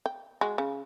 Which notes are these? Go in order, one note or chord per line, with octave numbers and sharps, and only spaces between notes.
G5
G#3 F#4
C#3